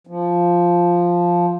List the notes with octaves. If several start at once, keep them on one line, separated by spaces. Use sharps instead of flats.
F3